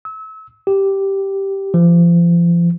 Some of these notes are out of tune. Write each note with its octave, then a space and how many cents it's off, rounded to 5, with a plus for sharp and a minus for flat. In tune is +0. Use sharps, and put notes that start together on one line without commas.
E6 -30
G4 -5
F3 -35